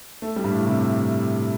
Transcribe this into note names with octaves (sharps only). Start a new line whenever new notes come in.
A3
G3
G2
A2
C3